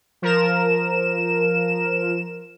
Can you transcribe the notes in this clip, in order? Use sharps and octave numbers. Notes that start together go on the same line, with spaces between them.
F3 A#4 E7